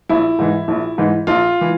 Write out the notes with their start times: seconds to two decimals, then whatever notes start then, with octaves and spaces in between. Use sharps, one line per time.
0.09 A#1 E4
0.39 G#2 E3
0.68 A#1
0.98 G#2 E3
1.27 A#1 F4
1.61 E3